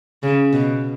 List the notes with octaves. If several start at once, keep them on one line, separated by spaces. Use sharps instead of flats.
C#3
B2